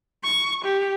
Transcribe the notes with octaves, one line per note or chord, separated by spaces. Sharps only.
C#6
G4